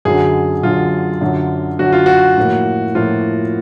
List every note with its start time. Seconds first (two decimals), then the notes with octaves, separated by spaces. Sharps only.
0.05 F#2 D3 F#3 G#4
0.63 F#2 D3 F#3 F4
1.21 F#2 D3 F#3
1.79 F#2 D3 F#3 F#4
1.92 F4
2.06 F#4
2.38 A2 F3 A#3
2.95 A2 F3 A#3 F4